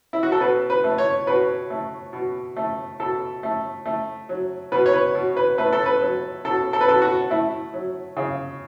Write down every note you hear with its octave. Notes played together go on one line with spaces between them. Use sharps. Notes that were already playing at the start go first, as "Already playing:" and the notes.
E4
F#4
A4
B2 B4
B4
A3
C#5
B2 B4
A3
B2
A3
B2 A4
A3
A3
F#3
B2 B4
C#5
B4
B2
B4
A3 B4
A4
B4
F#3
B2 A4
A4
B4
B2 A4
F#4
A3 E4
F#3
C#3